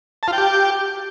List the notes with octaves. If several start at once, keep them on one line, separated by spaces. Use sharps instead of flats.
A5
F4
G5
G4